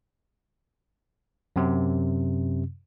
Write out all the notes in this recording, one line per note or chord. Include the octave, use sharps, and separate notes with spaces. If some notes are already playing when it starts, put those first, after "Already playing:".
F#2 C3